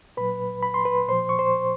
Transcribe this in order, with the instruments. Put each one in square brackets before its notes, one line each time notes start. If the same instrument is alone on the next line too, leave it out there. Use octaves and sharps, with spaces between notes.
[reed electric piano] A#2 F#3 B4 B5
B5
C6
B4 B5
A#2 F3 C5 C6
C#6
C5 C6